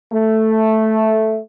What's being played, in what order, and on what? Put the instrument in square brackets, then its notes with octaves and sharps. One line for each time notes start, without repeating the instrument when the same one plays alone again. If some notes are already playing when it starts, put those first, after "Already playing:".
[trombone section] A3